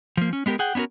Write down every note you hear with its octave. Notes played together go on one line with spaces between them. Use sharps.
F3 A#3
C#4
G#3 B3 G4 G#4 A#4
G#4 F#5 G5
B3 C#4 D4 F#4 A#4